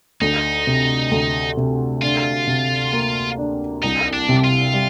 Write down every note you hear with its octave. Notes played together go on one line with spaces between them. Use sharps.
D2 D#4
C3
D2
C3
D4 F4
C3
A#3
D4
C2 D#4
D4
C3
F4
G3